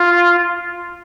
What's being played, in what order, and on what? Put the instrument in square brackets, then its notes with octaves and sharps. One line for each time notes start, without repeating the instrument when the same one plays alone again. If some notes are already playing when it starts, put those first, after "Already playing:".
Already playing: [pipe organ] F4